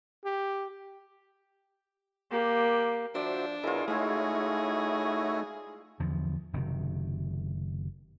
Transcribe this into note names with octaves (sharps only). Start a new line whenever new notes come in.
G4
A#3 G4
F3 D4 F#4 C5 D5 E5
B2 F#3 E4 F4 G#4 A#4 D#5
G#3 A3 D#4 E4 F#4 G#4 C#5 B5
E2 D3 F3
F#1 C3 D#3